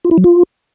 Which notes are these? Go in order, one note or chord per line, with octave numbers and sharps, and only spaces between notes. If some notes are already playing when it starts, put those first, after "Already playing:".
F4
E4
F#3
F4